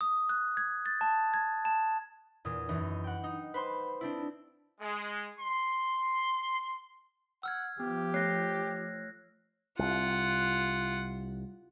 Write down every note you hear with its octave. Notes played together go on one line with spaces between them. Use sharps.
D#6
F#6
G#6
A6
A5
G#6
A5
E2 A#2 D#6
F#2 E3 D#4
F#5 G5
D#4
B4 C5 B5 C6
C4 D4 E4
G#3
C6
F#5 E6 F6 G#6
F3 B3 G4
A3 C#5 F#6 A#6 C7
C2 F4 F#5